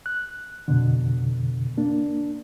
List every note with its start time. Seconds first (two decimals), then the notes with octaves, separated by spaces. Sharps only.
0.06 F#6
0.68 F2 B2 D3
1.77 A#3 D4